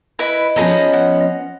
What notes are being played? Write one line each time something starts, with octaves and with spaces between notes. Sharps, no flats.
E4 B4 D#5
F3 B3 C#4 D#4 G#4 A#5
F#5